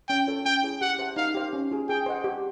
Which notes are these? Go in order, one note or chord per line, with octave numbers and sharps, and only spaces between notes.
C#4 G5
F4 A4 C#5
C#4 G5
E4 G#4 C#5
G4 F#5
C5 E5 A5
D#4 F5
G4 C5 F5
C#4
F4 G#4
G#4 G5
C5 D#5 F#5
G4